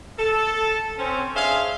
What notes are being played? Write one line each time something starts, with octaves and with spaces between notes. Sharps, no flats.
A4
C4 C#4
D4 G#4 C5 E5 F5